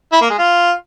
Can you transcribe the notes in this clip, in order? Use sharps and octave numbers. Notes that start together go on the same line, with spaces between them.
E4
A#3
G#3
F4